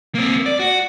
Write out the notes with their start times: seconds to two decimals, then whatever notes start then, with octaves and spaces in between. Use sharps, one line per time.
0.15 A#3 C4
0.46 D5
0.59 F#4